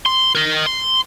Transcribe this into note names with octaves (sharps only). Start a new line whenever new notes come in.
C6
A#4 D#5
C6